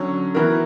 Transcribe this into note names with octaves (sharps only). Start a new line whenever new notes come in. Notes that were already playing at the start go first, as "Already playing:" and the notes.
Already playing: D3 F#3 C#4
E3 B3 F#4 A#4